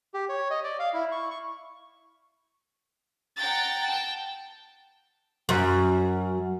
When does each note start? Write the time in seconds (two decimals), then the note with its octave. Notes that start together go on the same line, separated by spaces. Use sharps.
0.14 G4
0.29 C#5
0.50 D#5
0.64 D5
0.79 F5
0.94 E4
1.12 C#6
1.31 C#6
3.36 F#5 G5 A#5 A6
3.86 G5 A5
5.49 F#2